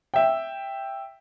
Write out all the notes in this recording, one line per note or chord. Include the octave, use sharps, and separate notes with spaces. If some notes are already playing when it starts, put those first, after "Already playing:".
E5 G5